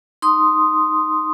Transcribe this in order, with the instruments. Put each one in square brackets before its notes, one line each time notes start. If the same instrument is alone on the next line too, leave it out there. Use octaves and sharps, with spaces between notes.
[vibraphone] D#4 C6 D#6